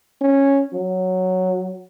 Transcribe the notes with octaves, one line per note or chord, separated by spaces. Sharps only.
C#4
F#3